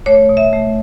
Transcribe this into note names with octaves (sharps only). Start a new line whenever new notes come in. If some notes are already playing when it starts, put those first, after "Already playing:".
A3 C#5
B2
E5
A3